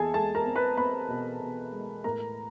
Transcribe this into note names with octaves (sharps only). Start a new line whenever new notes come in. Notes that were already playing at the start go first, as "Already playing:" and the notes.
Already playing: E2 G#4 A4 G#5 A5
G#3 A4 A5
A#4 A#5
C4
B4 B5
C4 B4 B5
B2
B2
G#3
A2 A#4 A#5